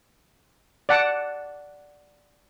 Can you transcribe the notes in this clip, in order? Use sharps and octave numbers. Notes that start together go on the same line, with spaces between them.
D5 F#5 A5